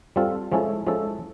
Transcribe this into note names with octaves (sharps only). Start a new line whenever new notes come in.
G3 C4 F4 A4
F3 G#3 C#4 E4 A4
F3 G#3 C#4 E4 A4